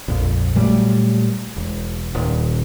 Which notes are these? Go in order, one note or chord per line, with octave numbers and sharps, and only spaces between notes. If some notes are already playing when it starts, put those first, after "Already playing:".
A#1 F2
A#2 F#3 G3 A3
E1
D#1